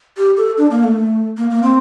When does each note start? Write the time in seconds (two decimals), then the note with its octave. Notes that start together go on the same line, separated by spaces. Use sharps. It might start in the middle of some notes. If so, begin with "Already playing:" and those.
0.17 G4
0.37 A4
0.58 D4
0.71 A#3
0.84 A3
1.37 A#3
1.50 A#3
1.63 C4